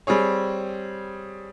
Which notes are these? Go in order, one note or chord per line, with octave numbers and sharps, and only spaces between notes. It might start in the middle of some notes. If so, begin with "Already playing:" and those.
G3 C4 G#4 C#5